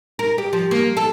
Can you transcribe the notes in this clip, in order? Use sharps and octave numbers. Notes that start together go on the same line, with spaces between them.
A#4
G4
F3
A#3
A4